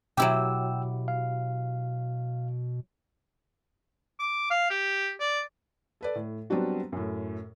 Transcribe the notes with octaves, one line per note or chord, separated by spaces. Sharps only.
B2 F#3 E4 G4 G5 E6
F5
D6
F5
G4
D5
A4 B4 D5
A2
F#3 G3 B3 C4 D4 F#4
F#2 A2